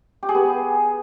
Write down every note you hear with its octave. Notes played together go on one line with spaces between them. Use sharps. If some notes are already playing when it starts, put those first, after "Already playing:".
G4
G#4
B3